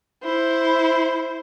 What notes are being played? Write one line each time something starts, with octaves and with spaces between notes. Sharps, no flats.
E4 C5